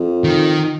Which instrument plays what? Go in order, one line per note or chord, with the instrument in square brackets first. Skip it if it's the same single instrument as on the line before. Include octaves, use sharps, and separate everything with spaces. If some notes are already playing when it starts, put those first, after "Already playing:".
Already playing: [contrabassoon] F2
[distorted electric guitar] D#3